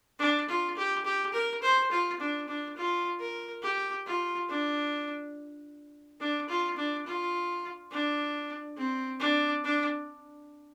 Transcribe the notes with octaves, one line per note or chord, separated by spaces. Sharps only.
D4
F4
G4
G4
A#4
C5
F4
D4
D4
F4
A#4
G4
F4
D4
D4
F4
D4
F4
D4
C4
D4
D4